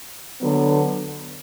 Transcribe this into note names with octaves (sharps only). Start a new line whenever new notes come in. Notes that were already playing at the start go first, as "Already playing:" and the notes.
D3 F#3 B3